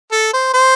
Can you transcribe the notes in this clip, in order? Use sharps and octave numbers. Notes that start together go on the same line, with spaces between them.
A4
C5
C5